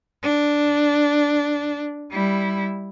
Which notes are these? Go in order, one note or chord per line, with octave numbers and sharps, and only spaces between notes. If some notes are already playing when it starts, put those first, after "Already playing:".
D4
G3 E4